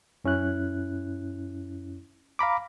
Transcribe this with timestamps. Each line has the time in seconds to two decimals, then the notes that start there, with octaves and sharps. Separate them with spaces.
0.24 F#2 C#4 E4 F#6
2.39 F5 A#5 B5 D6